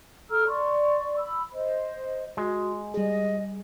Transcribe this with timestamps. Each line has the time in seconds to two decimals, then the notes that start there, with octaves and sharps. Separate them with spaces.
0.30 A4 A#5 E6 F6
0.48 D5 C6 C#6
1.18 B5 E6
1.52 C5 D#5
2.37 G#3 F#4
2.94 G3 G#4 D#5